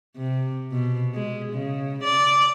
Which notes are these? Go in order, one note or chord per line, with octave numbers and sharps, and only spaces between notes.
C3
B2
G#3
C#3
D5